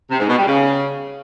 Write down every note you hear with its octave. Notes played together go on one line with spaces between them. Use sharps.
C3
G#2
B2
G3
C#3